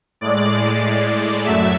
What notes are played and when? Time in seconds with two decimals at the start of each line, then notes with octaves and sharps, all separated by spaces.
0.21 A2 G#3 D5
1.45 F#2 F#3 A3 E5